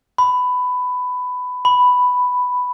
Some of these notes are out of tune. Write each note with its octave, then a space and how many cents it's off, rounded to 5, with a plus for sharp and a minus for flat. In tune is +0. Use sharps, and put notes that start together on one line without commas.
B5 +15
B5 +5